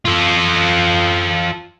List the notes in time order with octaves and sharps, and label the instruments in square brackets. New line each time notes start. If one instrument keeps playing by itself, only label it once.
[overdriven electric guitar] F4 A4